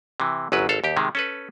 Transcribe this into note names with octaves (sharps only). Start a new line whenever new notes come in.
C3 E3
G1 F#2 F#3 B4
G#1 A4 F5
D#2 G4
C3 D#3 G#3
C#4 A4 B4